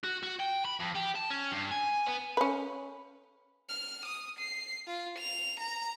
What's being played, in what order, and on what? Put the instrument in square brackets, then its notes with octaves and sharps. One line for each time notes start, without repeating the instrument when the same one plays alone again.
[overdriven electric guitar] F#4
F#4
G5
B5
F2
G4
A5
C#4
G2
G#5
B3
[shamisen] C#4 B4
[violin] F6
D#6
C7
F4
F7
A#5